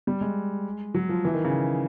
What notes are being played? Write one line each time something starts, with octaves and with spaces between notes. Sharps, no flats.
G3
G#3
F#3
F3
E3
D#3
C#3